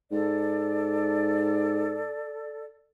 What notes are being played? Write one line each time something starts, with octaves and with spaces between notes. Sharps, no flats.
G#2 A4 D5